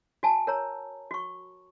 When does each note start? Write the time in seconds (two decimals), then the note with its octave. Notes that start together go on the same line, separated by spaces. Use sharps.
0.23 F#4 G#5 A5
0.47 A#4 C#5 A#5
1.11 F#4 C#6